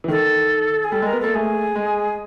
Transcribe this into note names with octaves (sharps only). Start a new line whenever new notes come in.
E3
D#3 A4
G#4
G3 A4
G#3
A#4
B3
A#3 A4
A3 G#4
G#3